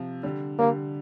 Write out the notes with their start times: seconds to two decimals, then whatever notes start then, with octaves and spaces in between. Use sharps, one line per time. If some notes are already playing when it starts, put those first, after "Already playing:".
Already playing: C3 F3
0.23 D3 G3
0.59 D3 G3 A#3